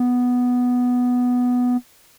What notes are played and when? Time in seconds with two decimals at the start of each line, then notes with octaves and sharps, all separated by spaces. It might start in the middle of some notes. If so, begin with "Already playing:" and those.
Already playing: B3